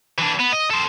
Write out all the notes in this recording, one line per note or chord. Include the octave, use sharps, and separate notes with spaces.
E3 D4
B3
D#5
A4 C5